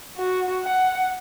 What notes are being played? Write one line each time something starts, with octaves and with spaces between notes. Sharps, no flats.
F#4
F#5